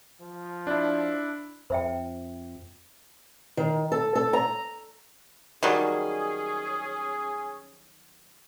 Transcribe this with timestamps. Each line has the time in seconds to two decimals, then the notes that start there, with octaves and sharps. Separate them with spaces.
0.21 F3
0.67 D4 E4
1.70 F2 C5 E5 G5
3.57 D#3
3.92 A4
4.15 A4
4.33 A#5
5.63 D#3 F#3 G3 C#4 G#4